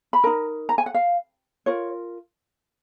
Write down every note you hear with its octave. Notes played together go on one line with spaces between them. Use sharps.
B5
D#4 A#4 A#5
A#5
G#5
F#5
F5
F4 A#4 C#5